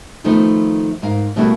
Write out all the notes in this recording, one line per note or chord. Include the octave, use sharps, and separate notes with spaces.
D#3 F3 A3 B3 D#4
G#2 A#4 F5
B2 G3 A3 A#3 E4 F#4